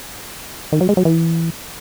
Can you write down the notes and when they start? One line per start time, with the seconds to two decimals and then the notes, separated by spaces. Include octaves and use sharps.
0.72 D#3
0.81 F#3
0.89 G#3
0.97 F#3
1.05 E3